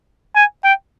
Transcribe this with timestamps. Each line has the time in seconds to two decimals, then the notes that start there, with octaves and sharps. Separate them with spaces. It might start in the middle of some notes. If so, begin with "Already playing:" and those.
0.36 G#5
0.64 G5